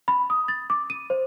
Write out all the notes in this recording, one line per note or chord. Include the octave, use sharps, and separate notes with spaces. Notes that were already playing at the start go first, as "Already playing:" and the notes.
B5
D#6
A6
D6
D#7
C5